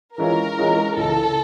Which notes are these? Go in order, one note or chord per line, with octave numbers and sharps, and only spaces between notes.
E3 G#3 C#4 F4 A#4
E3 G#3 C#4 F4
C#2 C#3 E3 A4